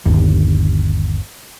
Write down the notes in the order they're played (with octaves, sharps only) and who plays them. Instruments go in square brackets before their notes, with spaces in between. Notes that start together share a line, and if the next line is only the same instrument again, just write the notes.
[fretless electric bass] G1 D#2